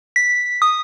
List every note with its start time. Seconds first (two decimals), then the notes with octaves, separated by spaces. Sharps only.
0.16 B6
0.62 D#6